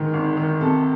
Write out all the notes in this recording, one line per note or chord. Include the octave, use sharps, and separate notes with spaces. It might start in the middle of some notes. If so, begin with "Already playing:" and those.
Already playing: D2 G#2 D#3 E3
G#1
D#3
C3 A4